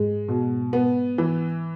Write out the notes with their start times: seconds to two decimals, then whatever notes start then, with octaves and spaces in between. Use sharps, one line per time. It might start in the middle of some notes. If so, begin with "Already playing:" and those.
Already playing: G#2 G#3
0.28 B2
0.73 B3
1.18 E3